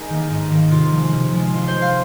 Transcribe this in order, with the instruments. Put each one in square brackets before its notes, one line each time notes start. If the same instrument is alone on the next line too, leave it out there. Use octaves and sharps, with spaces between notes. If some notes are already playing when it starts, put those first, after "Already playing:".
Already playing: [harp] D#4 G#4 A#4
D#3 A#3
G#2 D#4
D#3 A#3
C3 F4
F3 G#3
C3
F3 G#3
C3 F4
C5
G#3
F5